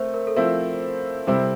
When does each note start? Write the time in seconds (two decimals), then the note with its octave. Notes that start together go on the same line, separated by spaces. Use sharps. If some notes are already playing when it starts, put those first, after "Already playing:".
Already playing: A3 C4 A#4 C5 E5
0.14 A#4
0.27 A4
0.36 F3 A3 C4 E4 A#4
1.27 C3 G3 C4 E4